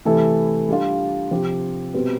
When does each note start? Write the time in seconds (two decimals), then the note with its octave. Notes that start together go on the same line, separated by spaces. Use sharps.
0.05 C3 E3 A3 E4 A4
0.69 G3 D4 F4
1.31 C3 F3 C4 G4
1.94 B2 G3 C4 G4 B4